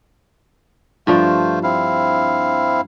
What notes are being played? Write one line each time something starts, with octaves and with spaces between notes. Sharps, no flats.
G2 F3 A3 D4 F4 C5
C4 E4 F5